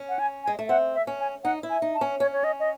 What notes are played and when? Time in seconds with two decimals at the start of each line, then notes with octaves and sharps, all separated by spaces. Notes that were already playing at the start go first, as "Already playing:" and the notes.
Already playing: C#4
0.09 F#5
0.19 G#5
0.44 G#5
0.47 G#3
0.59 A3
0.69 C4 F#5
0.95 E5
1.07 C#4
1.20 G#5
1.44 D#4 F#5
1.63 E4
1.70 G#5
1.82 D#4
1.95 A5
2.01 C#4
2.19 C#4 C#5
2.32 C#5
2.44 D#5
2.60 D#5